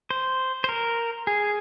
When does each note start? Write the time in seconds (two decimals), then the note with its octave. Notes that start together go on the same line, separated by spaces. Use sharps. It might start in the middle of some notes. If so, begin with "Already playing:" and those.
0.10 C5
0.64 C5
0.69 A#4
1.27 G#4